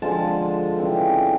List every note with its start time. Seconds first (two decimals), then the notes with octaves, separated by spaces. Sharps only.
0.02 D3 F3 G#3 A5
0.78 C#3 E3 G3 C4